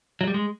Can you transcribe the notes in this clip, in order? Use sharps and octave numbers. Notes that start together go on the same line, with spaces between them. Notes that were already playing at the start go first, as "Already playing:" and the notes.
F#3
G3
G#3